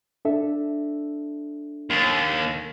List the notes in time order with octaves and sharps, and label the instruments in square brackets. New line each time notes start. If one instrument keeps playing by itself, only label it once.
[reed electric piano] D4 A4 E5
[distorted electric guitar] D#2